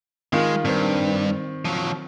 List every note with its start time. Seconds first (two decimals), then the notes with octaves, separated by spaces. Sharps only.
0.33 D#3 G#3 F4
0.65 G2 D#3 C4
1.65 F3 F#3